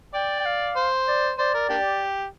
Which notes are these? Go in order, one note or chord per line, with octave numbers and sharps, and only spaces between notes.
D5 G5
G5
F5
C5
D5
C5 D5
A#4
A#3 D4 G4